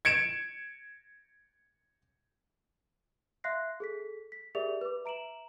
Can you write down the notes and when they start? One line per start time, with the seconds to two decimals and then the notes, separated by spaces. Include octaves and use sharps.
0.05 G#6 C#7 D7 E7
3.44 E5 F5 C6 F#6 A#6 C7
3.80 G#4 A4 B6
4.32 B6
4.55 G4 G#4 A#4 D5 E5 F7
4.81 B4 D6
5.05 E5 A#5 D7 E7 F#7